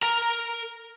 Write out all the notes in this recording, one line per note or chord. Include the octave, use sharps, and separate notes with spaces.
A#4 A#5